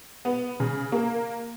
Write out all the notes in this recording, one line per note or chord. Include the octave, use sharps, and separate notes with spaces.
B3
C#3
A#3